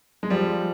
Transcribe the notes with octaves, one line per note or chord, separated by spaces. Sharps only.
G#3
F3 G3